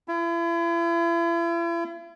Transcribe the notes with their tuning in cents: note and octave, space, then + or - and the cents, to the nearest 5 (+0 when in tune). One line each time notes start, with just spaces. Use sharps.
E4 +40